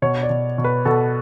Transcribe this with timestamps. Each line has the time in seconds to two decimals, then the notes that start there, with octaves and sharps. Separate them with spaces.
0.02 B2 C#5
0.23 D5
0.30 B2
0.58 B2
0.64 B4
0.85 B2 A4